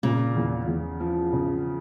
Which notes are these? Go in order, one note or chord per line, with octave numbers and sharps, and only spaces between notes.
A#2 C#3
E2
E2
F3
C#3